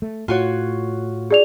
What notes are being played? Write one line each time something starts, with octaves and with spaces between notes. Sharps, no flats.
A3
A2 F4 F#4 C#5
G#4 D5 F7